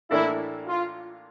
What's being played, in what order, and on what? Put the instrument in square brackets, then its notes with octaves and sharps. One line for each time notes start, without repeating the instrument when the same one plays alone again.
[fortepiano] A2 E3 A#3 D4 A4 [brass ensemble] E4
[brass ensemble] F4